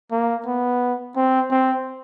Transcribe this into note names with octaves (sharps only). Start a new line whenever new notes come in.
A#3
B3
C4
C4